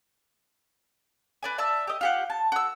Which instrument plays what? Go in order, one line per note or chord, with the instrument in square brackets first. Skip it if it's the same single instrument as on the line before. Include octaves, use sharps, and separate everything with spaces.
[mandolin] B4 D5 G#5
D5 E5 A5 E6
G4 D#5
F4 G4 F#5
A5
F#4 E6